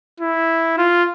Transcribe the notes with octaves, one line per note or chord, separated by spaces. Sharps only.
E4
F4